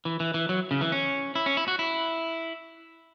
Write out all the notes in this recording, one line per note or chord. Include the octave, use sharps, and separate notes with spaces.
E3
E3
E3
F#3
C#3
E3
C#4
E4
C#4
E4
F#4
E4